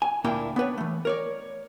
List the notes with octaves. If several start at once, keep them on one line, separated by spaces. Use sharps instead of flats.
G#5
D2 A#2 A#3 D4 E4 G5
B3 D4 B4 C#5
E3 A3
A#4 C#5 D5